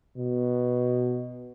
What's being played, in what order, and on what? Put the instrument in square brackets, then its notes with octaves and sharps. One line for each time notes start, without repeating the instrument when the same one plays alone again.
[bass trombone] B2